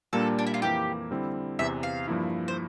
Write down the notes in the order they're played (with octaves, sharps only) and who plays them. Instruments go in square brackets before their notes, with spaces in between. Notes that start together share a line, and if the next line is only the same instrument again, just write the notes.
[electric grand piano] A#2 G3 A#3 D4 [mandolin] A4
[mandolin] D4
E4
F4
[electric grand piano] F2 E3 A#3 E4 [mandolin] G4
[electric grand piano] D3 G3 C4 E4
[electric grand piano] E2 C3 E3 [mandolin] E5
[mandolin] F5
[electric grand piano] G2 F3 A#3 E4
[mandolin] C5